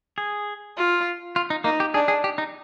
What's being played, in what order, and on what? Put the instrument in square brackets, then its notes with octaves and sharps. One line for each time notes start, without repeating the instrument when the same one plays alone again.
[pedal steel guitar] G#4
[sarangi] F4
[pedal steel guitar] F4
D#4
[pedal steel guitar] A#3 [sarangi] D#4
[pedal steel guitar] G4
[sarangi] D4 [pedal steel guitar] G#4
[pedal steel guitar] G#4
G4
D#4